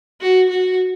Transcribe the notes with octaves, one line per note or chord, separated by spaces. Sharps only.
F#4
F#4